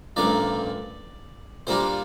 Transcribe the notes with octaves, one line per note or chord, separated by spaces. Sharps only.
A1 G2 D3 F3 A#3 D5
A#2 G3 A#3 D4 F4 C5